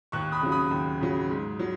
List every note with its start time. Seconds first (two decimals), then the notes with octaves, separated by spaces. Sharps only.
0.12 D#2 C#6 F#6
0.32 B5 D#6
0.41 C#3 F#3
0.52 B5 D#6
0.71 D#2
1.01 C#3 F#3
1.30 G#2
1.59 F#3